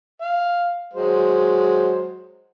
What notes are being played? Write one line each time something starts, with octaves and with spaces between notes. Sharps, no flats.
F5
F#3 G#3 C5